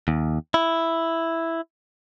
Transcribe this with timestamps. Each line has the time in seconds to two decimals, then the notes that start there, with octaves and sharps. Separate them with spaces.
0.08 D#2
0.54 E4